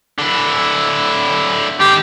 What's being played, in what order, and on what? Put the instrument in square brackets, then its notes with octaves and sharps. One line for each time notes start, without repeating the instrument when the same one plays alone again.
[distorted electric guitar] D3 E4
[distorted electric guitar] D#3 C4 [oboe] G4